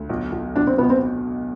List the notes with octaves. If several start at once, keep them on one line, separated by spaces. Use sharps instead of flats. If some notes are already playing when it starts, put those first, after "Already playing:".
Already playing: D2
B1
B1
B1 D4
C4
B2 B3
C4